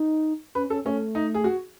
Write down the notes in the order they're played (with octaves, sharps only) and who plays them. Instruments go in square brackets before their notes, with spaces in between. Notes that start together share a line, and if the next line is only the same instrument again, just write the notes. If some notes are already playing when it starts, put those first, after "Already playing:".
Already playing: [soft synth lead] D#4
[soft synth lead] C#4 [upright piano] B4
[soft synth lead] C#4 [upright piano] A4
[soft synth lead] A3 [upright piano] C#4
[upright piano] D#4
G#4
F#4